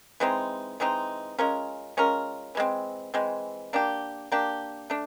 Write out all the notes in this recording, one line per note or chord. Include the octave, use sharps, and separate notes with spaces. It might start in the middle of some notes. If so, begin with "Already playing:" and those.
E3 G#3 C4 D#4
E3 G#3 C4 D#4
G#3 C#4 F4 A#4
G#3 C#4 F4 A#4
E3 G#3 C4
E3 G#3 C4
A#3 D4 G4
A#3 D4 G4
A3 D4